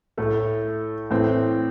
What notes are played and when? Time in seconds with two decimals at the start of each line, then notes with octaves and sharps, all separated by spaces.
0.17 A2 A3 E4 A4
1.11 A2 E3 A3 C4